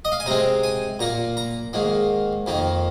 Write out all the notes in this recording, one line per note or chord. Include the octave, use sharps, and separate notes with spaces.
D#5
F5
G#5
C3 G#3 C4 A#5
G#5
A#2 A#3 A#5
A#5
G#2 D#3 A#3
F2 D#3 A#3